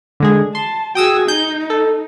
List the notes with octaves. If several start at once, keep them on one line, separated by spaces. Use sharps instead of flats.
D3 G#3 G#4
A5 C6
F#4 G#4 G5 D#6 E6
D#4 G6
A4